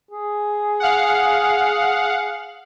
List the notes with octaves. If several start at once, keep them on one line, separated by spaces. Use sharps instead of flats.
G#4
F5 F#5